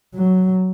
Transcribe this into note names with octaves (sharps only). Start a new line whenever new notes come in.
F#3